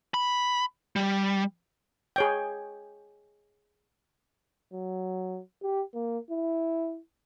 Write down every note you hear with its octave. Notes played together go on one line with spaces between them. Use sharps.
B5
G3
G#4 C#5 G5
F#3
G4
A#3
E4